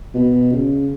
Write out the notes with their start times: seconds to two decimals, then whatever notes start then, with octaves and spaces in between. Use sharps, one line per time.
0.15 B2
0.53 C#3